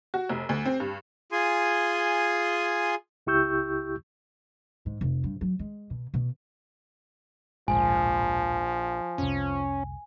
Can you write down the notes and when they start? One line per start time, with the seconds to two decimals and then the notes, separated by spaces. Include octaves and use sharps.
0.14 F#4
0.29 F1
0.49 D2
0.66 C4
0.80 G2
1.32 F4 G#4 G#5 C6
3.27 C#2 E4 G4 C#6 E6 G6
4.86 G#2
5.01 F1
5.24 G2
5.41 F#3
5.59 G#3
5.90 B2
6.14 B2
7.68 D1 A#1 G#2 F3 G#5
9.18 F1 C2 C#4